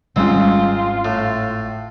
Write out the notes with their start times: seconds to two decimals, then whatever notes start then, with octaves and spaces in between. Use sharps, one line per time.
0.16 G#1 G#2 G3 C4 C#4 F4
1.05 A2